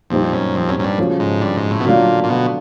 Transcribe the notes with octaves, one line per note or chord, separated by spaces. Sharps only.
F2 A#2 G3 C4 D#4 G4
F#2
F2
F#2
F#2
G2
C#3 F3 A3 C#4 F#4
G#2
G2
G#2
A2
B2
A#2 D3 F#3 A3 D4 F4
A#2
B2